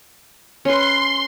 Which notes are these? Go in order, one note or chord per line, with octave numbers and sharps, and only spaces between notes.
C#4 B4 C6